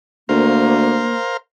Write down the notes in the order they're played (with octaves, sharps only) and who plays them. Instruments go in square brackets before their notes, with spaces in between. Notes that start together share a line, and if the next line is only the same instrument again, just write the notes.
[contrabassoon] D2 [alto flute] A#3 [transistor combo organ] A#4 C5 F5